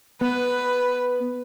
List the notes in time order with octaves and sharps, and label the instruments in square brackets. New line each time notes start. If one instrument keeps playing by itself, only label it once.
[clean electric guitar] B3 [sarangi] B4